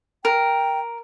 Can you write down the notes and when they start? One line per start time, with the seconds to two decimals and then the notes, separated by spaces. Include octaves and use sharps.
0.25 A#4 G5